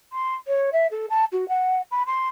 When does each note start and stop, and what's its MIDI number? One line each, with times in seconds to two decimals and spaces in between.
0.12 0.34 84
0.47 0.70 73
0.72 0.87 76
0.91 1.06 69
1.10 1.25 81
1.32 1.47 66
1.48 1.81 78
1.91 2.03 83
2.06 2.28 84